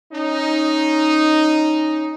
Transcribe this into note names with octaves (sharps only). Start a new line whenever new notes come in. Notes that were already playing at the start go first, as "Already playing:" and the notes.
C#4 D#4